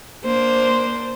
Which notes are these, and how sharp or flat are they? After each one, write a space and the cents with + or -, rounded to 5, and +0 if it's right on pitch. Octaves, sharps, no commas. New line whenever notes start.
A#3 +15 D4 +0 C5 +0